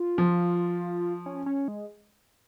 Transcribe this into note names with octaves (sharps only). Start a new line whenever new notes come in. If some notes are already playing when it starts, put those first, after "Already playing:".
Already playing: F4
F3
C#4
C#4
G#3